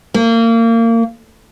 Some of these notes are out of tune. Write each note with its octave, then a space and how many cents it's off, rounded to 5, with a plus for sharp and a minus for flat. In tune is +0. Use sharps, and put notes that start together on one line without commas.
A#3 -30